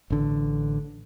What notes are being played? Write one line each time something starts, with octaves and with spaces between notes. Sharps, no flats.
A1 D3